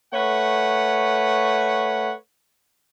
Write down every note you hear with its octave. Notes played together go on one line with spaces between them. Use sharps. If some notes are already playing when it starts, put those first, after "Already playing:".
A3 B4 C#5 F#5